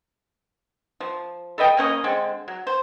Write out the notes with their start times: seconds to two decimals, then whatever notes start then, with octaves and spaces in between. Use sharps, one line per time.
1.00 F3
1.58 A4 B4 D#5 G5
1.77 A#3 C#4 C5 D#5
2.04 D3 G#3 C4
2.48 F#3
2.67 C5